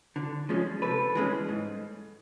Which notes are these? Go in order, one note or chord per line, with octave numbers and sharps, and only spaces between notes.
D3
F3 G#3 C#4
C3 A4 B4
E3 G#3 C#4
G#2